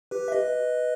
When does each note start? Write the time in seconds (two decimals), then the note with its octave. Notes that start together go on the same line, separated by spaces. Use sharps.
0.11 G4 B4
0.28 E5
0.32 B4 D#5